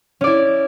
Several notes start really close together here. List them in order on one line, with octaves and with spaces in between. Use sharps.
C#4 D5 E4